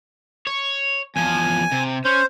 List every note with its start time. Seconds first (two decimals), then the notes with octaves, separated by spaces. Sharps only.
0.47 C#5
1.16 E2 F3 G#5
1.71 C3
2.05 C#4 C5